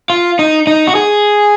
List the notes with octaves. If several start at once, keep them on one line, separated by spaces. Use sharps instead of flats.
F4
D#4
D#4
F#4
G#4